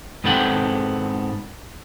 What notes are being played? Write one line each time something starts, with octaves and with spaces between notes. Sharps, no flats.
G#2 B3 C4 A4 F#5 G5